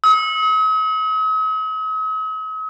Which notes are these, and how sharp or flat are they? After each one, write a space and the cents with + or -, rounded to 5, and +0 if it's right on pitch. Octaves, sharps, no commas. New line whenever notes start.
D#6 +45